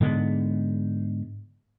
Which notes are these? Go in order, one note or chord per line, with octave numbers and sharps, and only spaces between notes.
G#2 D3 G#3 B3